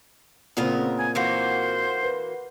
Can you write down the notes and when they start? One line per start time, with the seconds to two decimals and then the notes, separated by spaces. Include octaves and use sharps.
0.57 A#2 C#3 B3 C4 A#4
0.98 G#5
1.15 E3 A#3 F#4 C5
2.03 B4